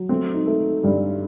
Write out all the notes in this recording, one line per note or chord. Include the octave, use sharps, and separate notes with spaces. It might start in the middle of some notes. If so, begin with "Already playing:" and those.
Already playing: F#3
A3 C4
D#4
A3
G2 G3